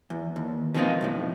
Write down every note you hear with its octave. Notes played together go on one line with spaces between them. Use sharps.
E2
D#2
B2 D#3 F3 C4 D#4 F4
B1 F2 A2